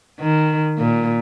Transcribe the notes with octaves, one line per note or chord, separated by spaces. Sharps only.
D#3
A#2